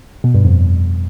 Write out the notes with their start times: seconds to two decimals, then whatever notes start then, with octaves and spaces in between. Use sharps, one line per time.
0.24 B2
0.34 G2
0.45 F2